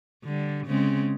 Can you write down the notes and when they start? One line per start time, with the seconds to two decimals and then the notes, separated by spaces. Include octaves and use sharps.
0.24 D3 G3
0.67 C#3 G#3 C4